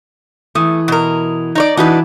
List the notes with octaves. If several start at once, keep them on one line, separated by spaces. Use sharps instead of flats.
E3 A3 D#6
B2 A#4
D#4 C#5 D5
E3 D4 D#4 F#4 B4